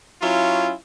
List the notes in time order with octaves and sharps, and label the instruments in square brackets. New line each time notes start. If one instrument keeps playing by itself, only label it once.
[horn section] F#3 C#4 E4 F4